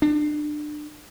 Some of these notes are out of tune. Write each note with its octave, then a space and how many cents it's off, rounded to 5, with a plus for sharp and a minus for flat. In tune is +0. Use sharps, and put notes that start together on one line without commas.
D4 +30